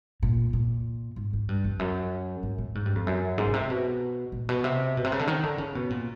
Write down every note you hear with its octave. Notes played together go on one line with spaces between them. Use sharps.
A#2
A#2
G#2
G#2
G2
F2
F#2
G#2
A2
G#2
G2
F2
F#2
G#2
B2
C3
B2
A#2
B2
C3
B2
C3
C#3
D3
D#3
D3
C#3
B2
A#2